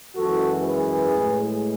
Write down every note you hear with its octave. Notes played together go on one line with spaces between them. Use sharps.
F#2 E3 G#3 F#4 A4
G#4 B4
A2 G#3